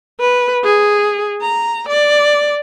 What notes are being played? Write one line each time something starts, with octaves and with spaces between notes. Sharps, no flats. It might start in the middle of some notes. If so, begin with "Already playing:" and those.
B4
G#4
A#5
D5